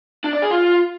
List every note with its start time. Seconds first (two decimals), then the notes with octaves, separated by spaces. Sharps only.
0.24 D4
0.33 D5
0.42 G#4
0.51 F4